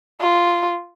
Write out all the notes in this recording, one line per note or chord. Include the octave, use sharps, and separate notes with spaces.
F4